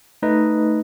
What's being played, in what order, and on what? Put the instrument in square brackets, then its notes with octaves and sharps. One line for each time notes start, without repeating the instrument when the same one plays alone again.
[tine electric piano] A3 D#4 B4 D#5